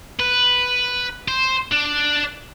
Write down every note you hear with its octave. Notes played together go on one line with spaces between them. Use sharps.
B4
C5
D4